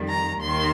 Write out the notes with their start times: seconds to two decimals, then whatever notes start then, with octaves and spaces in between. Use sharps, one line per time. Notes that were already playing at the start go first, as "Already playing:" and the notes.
Already playing: F2 D#3 G3
0.09 A#5
0.42 D#2 D#3 C6